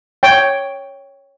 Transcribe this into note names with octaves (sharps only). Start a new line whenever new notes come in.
C#5 G5